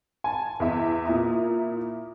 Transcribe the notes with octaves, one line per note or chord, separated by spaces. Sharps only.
G#5 A5
E2 E5
A#2 E4 A#5 D#6